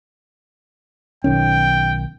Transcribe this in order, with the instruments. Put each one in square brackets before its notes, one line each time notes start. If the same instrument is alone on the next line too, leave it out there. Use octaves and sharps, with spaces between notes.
[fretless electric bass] B1 D#3 C#4 [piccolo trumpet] G5